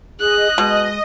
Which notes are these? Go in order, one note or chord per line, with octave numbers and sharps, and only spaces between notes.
G#4 D#5 F#6
B2 G#3 D#5